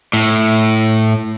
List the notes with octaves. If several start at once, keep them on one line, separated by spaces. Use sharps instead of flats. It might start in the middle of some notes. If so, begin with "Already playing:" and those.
A2